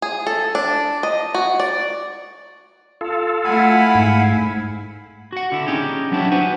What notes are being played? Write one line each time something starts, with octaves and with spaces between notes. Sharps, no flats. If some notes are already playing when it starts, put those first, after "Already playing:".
G#4
A4
D4
D#5
F#4
D5
F4 A4
A3 E4 F5 F#5 G#5 B5
G#2
F#4 F#5
D3 E4
C#4 D#4 G4 G#4
F#3 B3 D4 E4 F#4 G4
F#4 B4 C5 F#5 G#5